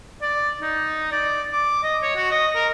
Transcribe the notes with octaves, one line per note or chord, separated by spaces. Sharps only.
D5
D#4
D5
D6
D#5
C#5
F#4
D#5
A#4